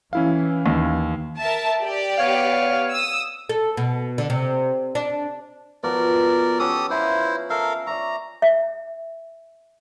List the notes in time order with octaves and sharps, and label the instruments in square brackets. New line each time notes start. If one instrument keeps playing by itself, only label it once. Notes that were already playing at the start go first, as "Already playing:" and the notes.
[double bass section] E3 [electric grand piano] C#4 E4 F5
[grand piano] D#2
[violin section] A#4 E5 A5
G4 D5
[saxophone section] B3 C#5 F5
[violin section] D#6 E6
[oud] A4
B2
D3
C3
D4
[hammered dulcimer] B2 F3 B3 [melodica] A#4 D5
[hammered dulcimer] B3 C#4 [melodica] G4 A4 D#6
[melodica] E4 C5 [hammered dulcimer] F4 E5 A#5
[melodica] A4 A#4 F5 [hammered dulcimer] E5
[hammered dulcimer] D5 E5 C#6 [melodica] A#5
[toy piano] E5